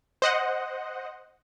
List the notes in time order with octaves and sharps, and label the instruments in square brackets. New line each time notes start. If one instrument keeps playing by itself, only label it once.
[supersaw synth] C5 D#5 F#5